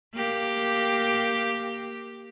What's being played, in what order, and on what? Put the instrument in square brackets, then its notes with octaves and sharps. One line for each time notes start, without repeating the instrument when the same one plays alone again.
[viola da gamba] A#3 G4